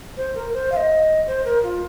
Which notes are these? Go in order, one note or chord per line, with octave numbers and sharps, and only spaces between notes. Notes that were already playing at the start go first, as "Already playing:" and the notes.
C5
A#4
C5
F5
D#5
C5
A#4
F4